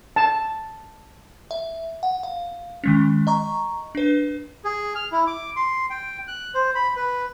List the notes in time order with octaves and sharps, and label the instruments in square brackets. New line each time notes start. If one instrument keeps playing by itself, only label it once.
[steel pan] A5
[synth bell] E5
F#5
F5
D#3 G#3 C#4
D#5 A#5 C#6
D4 B4
[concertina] G#4
F6
E4
D6
C6
G5
F#6
C5
B5
B4